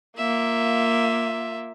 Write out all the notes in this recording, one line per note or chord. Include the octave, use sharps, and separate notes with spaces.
A#3 F4 E5